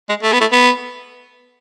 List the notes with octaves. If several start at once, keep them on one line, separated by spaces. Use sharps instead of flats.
G#3
A3
B3
A3
B3